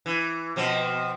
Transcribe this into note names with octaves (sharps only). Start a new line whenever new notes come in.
E3
B2 F3 C4